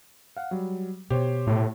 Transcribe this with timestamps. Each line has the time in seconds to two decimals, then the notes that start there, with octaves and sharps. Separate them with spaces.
0.37 F5 F#5
0.51 F#3 G3
1.10 B2 G4 C5 C#5
1.47 A2